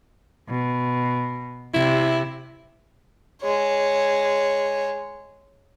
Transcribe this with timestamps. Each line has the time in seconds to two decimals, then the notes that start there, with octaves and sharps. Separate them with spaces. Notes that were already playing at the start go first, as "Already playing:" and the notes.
0.49 B2
1.74 C3 E4
3.42 G#3 C#5